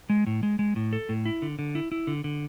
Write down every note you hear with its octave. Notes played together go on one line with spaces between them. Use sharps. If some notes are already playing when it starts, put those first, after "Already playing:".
G#3
A2
G#3
G#3
A2
A4
A2
E4
D3
D3
E4
E4
D3
D3